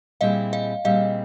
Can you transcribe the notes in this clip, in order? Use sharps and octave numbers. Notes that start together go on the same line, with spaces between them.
A#2 G3 C4 E4 G#4 D#5 F5
D#5 F5
A#2 G3 C4 E4 G#4 D#5 F5